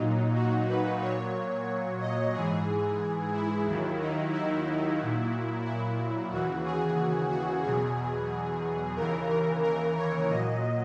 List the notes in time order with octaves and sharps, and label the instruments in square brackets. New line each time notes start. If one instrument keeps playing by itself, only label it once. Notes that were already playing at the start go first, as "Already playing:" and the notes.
Already playing: [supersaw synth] A#2 F#3 D#4
F#4
B4
A#2 F#3 C#5
D#5
G#2 E3 G#4
E4
D#2 D#3 F#3
D#4
E4
A#2 F#3
E4
D#2 C#3 E3 F#4
G#4
F#4
E2 B2 F#3 G#4
D#2 C#3 E3 A#4
A#4
A#4
C#5
A#2 F#3 D#5